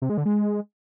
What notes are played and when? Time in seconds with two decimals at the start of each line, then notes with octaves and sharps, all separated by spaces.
0.02 C3
0.10 G#3
0.18 D3
0.25 G#3